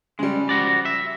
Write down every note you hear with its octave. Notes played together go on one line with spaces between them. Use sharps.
C#3 G3 G#3
F3 F#4 D5
E5